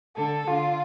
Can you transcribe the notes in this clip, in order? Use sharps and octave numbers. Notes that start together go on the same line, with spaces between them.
D3 A4
D3 F4